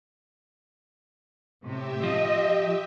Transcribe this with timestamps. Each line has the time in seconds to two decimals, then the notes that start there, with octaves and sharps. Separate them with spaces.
1.64 A2 C3 G4 E5
2.04 F3 F4 D#5